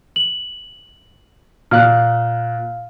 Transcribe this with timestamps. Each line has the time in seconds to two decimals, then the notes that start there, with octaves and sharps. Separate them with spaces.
0.16 F#7
1.71 A#2 F5 F6 F#6